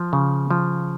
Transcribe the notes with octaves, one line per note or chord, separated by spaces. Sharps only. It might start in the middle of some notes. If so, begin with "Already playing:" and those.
Already playing: F3
C#3
F3